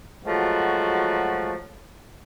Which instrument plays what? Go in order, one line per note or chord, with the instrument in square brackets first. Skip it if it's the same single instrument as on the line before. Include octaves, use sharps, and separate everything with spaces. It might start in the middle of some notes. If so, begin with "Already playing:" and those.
[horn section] F3 F#3 G#3 A3 F#4